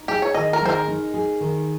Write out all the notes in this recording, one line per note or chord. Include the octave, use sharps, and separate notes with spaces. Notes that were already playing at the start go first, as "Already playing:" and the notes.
Already playing: D#4
G4 G#4
C#5
D#3 D#5
A#4
G#3 C5
A#4
D#4
G#4
D#3